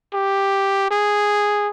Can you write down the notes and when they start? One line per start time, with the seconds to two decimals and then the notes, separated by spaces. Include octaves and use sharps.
0.14 G4
0.91 G#4